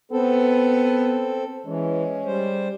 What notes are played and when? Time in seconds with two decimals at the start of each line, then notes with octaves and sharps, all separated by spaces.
0.12 B3 C4 A4
1.66 E3 G#3 C#4
2.26 G3 C5